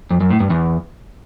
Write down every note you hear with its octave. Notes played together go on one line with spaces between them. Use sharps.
F2
F#2
A2
G2
E2